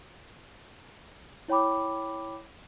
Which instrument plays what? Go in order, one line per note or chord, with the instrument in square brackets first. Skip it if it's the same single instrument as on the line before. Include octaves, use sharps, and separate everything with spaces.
[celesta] E4 C#5 G5 B5 D6